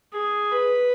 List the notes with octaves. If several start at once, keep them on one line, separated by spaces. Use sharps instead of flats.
G#4
B4